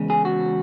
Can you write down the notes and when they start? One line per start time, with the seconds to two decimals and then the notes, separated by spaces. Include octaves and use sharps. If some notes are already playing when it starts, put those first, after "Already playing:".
Already playing: E2 C#3 G#3
0.10 G#4
0.25 F#4